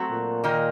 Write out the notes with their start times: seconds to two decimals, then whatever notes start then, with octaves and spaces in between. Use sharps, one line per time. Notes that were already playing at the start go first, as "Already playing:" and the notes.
Already playing: F#3 A3 C4 F#4
0.12 A#2
0.44 D#3 A#3 D#4